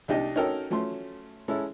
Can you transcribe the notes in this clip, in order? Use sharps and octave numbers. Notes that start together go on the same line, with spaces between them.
C2 D4 D#4 G4 D#5
C#4 D#4 F#4 A4 A#4 G5
F3 F#3 A3 C#4 C6
G#3 C#4 E4 A4